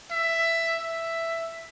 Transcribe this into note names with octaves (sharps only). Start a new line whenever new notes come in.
E5
E5